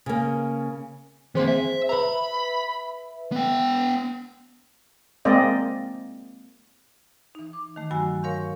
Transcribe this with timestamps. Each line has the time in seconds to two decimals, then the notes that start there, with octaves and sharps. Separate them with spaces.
0.06 C#3 A#3
1.35 E3 A#3 C4 G#4 C5
1.48 E5
1.89 B4 E5 A#5 B5
3.32 B3 G5
5.25 G#3 A#3 C4 D5 D#5
7.35 E3 D#4
7.53 D6
7.76 D#3 A3
7.91 G2 F#3 A3 F#4 G#5 E6
8.23 A#4 C#5 F5 C6 C#6 G6